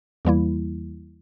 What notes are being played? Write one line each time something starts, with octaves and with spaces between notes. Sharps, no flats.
E2 E3 G3 A#3 E4